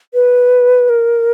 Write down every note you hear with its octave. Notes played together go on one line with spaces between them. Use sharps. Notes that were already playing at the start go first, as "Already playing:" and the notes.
B4
A#4